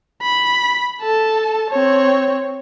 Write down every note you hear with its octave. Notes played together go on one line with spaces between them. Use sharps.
B5
A4 A5
C4 C#5